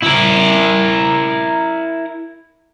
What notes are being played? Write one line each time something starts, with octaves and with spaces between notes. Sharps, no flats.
E4 A#4